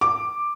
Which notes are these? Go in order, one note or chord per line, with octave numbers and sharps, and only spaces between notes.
D6